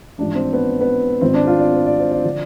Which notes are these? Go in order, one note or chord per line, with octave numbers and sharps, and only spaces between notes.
A1 G#2 F3 D4
C4
B3
B3
G#1 G#2 F3 C4
D4
F4
D5
C5
D5
C5
D5
D3 F3